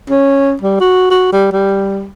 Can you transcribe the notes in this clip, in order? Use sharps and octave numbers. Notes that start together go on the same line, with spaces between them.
C#4
G3
F#4
F#4
G3
G3